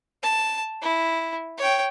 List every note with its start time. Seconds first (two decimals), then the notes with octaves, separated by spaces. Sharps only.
0.23 A5
0.82 E4
1.58 C#5 G5